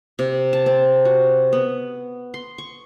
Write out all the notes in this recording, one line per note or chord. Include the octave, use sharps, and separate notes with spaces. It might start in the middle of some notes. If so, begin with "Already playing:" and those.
C3
A5
C4
F#4
B3
C6
C#6